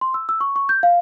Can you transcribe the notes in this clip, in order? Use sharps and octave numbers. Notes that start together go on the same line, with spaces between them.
C6
E6
E6
C#6
C#6
G6
F5